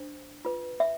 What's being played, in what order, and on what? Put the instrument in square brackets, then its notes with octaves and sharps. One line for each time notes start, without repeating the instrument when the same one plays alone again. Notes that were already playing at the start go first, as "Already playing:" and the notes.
Already playing: [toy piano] D4 C5
F4 B4
E5